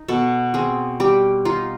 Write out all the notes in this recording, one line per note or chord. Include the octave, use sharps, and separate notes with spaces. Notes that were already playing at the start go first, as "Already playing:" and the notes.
Already playing: D#4
B2 A4
C4 G#4
G3 G4
D#4 F4